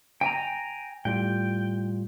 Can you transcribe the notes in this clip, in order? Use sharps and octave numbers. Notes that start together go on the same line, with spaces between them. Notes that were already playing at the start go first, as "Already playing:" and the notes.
G5 G#5 A#5
A2 G3 F4 G5